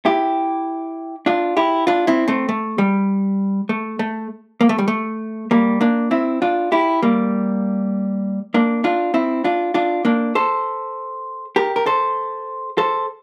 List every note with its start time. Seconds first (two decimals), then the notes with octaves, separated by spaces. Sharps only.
0.05 E4 G4
1.26 D4 F4
1.57 E4 G4
1.87 D4 F4
2.07 C4 E4
2.28 A3 C4
2.49 A3
2.78 G3
3.69 A3
3.99 A3
4.61 A#3
4.69 A3
4.78 G3
4.88 A3
5.51 G3 A#3
5.81 A#3 D4
6.11 C4 E4
6.42 D4 F4
6.72 E4 G4
7.03 G3 A#3
8.54 A#3 D4
8.84 D4 F4
9.14 C4 E4
9.44 D4 F4
9.74 D4 F4
10.05 A#3 D4
10.35 A4 C5
11.56 G4 A#4
11.76 A#4
11.86 A4 C5
12.78 A4 C5